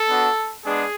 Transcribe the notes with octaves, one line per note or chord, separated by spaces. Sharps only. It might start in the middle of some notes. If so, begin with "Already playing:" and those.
Already playing: A4
B3 D4 F#4
G#3 B3 D4 G#4